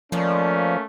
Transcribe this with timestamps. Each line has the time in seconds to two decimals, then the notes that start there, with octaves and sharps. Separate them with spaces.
0.12 D#3 F3 A3 A#3 C#4 D4